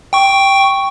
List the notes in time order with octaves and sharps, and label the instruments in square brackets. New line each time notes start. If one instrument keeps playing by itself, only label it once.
[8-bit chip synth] G5 C#6